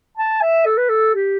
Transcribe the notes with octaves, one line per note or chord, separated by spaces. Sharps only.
A5
E5
A4
B4
A4
G4